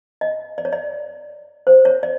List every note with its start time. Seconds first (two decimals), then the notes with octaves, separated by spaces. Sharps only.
0.21 D#5
0.58 D5
0.65 C#5
0.73 D5
1.67 C5
1.85 C#5
2.03 D5